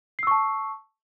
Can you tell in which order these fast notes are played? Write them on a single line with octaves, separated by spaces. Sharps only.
C7 E6 C#6 A5